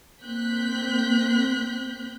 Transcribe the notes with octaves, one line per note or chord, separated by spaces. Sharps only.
A#3 C4 F#6 G6 B6